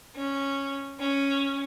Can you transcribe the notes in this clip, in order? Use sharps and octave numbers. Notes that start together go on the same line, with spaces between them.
C#4
C#4